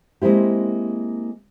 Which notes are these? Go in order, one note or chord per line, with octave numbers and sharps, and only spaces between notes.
G#3 A#3 C4 E4 G4